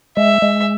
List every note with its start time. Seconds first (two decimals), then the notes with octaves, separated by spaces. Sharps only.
0.17 G#3 E5
0.42 G#3